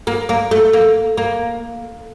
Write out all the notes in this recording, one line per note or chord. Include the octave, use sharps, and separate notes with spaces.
A#3
A#3
A3
A#3
A#3